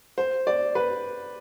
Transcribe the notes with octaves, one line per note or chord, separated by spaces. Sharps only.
C5
D5
B4